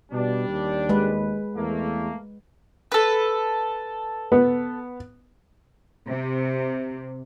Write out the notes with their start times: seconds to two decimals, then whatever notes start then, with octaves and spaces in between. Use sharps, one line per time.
0.12 B2 G3 D4
0.48 D#2
0.89 G#3 B4
1.56 E2 A3 A#3
2.92 A4 B4
4.32 B3
6.08 C3